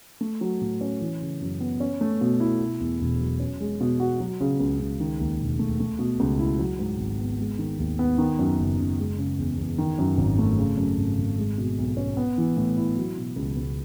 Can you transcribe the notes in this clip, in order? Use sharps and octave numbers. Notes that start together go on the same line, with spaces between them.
A3
F#3
A2
C#4
E3
C#3
F#2
B3
C#4
A3
B2
E4
B2
E2
E1
F#3
C#4
G#3
B2
F#4
F#3
C#3
C#2
C#2
D#3
D#2
E1
A3
A3
B2
C#2
E4
F#3
G#2
G#1
B3
G#3
D#3
D#2
B3
D#3
F#2
F#1
F#1
G#3
C#3
E2
E2
D#3
F#2
G#1
A3
C#3
F#2
G#1
G#1
G#3
B2
B1
C#4
B3
E3
A2
E4
F#3
B2
C#2
C#2